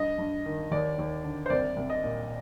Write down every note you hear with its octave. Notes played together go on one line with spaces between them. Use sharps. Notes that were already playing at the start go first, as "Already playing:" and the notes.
Already playing: G2 D#5
G2
D#3
D#2 D5
D#2
D3
C5
C2 D5
C2
D#5
A#2